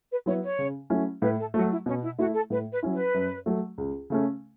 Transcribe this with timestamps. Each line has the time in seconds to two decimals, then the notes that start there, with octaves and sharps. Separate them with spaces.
0.10 B4
0.26 F#3 B3 E4 C#5
0.42 C#5
0.59 C#3
0.90 F#3 A3 C#4 E4
1.22 A2 B4
1.39 A4
1.54 A3 F#4
1.58 F#3
1.70 E4
1.86 B2 C#4
2.02 E4
2.18 A3 E4 F#4
2.34 A4
2.50 A2 B4
2.71 B4
2.83 F#3 C#4 E4
2.93 B4
3.14 F#2
3.46 F#3 A3
3.78 C#2
4.10 C#3 A3 C#4